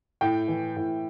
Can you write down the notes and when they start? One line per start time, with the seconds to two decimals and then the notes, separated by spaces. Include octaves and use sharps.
0.21 A2 G5
0.48 E3
0.76 A2